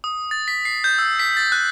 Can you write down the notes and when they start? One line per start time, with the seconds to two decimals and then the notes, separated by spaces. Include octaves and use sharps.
0.04 D#6
0.31 A6
0.48 B6
0.65 C7
0.84 G6
0.98 E6
1.19 B6
1.37 A6
1.52 F#6